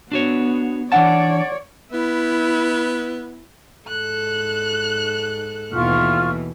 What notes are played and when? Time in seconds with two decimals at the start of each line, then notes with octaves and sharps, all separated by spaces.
0.12 B3 D4 F#4 C#5
0.92 E3 C#4 D4 C#5 D5 F#5 G5 A5
1.93 B3 E4
3.88 G#2 A4 F#6
5.72 D#2 B2 E3 F4 C#6 F6